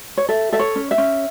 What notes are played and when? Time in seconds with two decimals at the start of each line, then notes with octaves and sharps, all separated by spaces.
0.17 C#5
0.29 A4 E5
0.52 A4 E5
0.59 C#5
0.76 C#4
0.91 E5
0.98 C#4